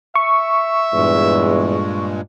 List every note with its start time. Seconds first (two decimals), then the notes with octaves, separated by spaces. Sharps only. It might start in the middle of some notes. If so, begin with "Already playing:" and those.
0.15 E5 C#6
0.93 E2 G2 A#2 G#3